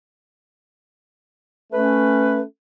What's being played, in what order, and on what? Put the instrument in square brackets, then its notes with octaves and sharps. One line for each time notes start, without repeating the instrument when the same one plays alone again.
[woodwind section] A3 C#4 B4